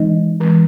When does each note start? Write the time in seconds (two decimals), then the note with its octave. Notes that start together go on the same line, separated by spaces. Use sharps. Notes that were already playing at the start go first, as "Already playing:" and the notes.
Already playing: E3 G#3 C4 D#4 D#5
0.40 E3 G#3 C4